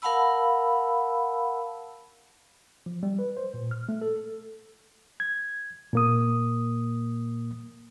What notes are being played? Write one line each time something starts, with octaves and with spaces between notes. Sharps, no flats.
A#4 F5 F#5 A5 B5 E6
F3
G3
B4
C5
A#2
F6
A3
A4
G#6
A#2 A#3 D#6